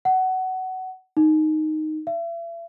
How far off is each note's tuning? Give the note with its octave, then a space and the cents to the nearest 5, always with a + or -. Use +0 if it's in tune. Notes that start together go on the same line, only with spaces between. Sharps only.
F#5 +20
D#4 -5
E5 +40